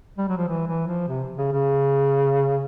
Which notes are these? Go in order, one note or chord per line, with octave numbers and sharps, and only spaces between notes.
G3
F#3
F3
E3
E3
F3
C3
C#3
C#3